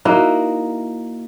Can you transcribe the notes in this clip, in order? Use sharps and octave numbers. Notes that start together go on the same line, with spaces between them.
A#3 D#4 E4 F#4